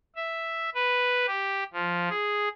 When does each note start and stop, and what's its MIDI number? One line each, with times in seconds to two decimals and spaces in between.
0.16 0.69 76
0.75 1.26 71
1.27 1.63 67
1.73 2.09 53
2.10 2.49 68